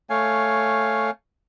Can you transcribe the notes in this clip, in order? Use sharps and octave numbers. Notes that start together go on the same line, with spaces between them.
A3 C#5 F5 G#5